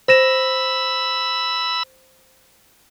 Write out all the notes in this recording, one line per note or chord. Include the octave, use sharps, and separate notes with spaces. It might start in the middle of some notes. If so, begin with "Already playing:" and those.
C5 B5 E6 A#6 E7